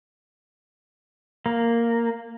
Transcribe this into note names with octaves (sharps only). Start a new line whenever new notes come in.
A#3